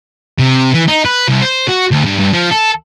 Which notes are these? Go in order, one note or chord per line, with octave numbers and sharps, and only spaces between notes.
C3
E3
D#4
B4
C2
C5
F#4
D2
G2
G2
F3
A4